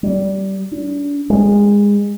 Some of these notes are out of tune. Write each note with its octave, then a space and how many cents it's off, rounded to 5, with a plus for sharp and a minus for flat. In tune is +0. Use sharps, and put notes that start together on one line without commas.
G3 -20
D4 -35
G#3 -25